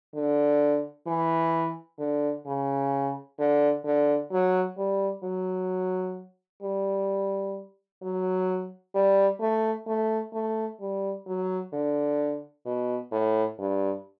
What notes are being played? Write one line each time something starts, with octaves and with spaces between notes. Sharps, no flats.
D3
E3
D3
C#3
D3
D3
F#3
G3
F#3
G3
F#3
G3
A3
A3
A3
G3
F#3
D3
B2
A2
G2